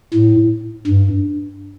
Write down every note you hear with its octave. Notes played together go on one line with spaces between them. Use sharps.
A2
G2